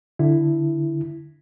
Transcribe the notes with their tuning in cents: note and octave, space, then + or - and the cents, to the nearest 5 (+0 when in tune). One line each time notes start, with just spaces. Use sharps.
D3 +0 E4 +5